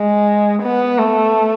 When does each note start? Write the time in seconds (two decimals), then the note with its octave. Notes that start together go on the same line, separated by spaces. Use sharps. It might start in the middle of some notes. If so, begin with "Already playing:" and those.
Already playing: G#3
0.63 B3
0.98 A3